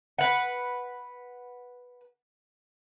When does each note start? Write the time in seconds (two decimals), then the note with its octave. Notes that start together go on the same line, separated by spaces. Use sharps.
0.19 B4 F#5